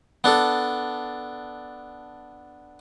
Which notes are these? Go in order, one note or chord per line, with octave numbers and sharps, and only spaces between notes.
B3 D4 A4